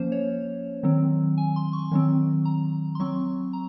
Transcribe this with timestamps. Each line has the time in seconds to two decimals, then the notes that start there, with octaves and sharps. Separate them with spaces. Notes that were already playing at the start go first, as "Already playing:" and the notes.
Already playing: F3 A#3 C#4 C5
0.12 C#5
0.83 D#3 F#3 C4
1.38 G#5
1.56 C6
1.73 C#6
1.91 D#3 F#3 C4
2.45 A#5
2.95 C6
3.00 F#3 C4 C#6
3.53 A#5